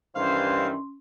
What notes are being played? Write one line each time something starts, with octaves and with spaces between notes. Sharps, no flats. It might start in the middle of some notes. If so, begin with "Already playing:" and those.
G2 D#3 E3 C#4 C5 F5 C6